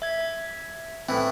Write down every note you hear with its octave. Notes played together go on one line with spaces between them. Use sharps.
E5 G#6
A2 E3 C4